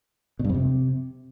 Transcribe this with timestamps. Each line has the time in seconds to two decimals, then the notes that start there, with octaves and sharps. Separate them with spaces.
0.39 B2
0.44 G2
0.49 F2
0.54 C3